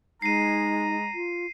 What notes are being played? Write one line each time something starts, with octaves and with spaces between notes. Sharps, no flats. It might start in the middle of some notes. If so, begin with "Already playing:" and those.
G#3 D#4 A#5 C7 D#7
F4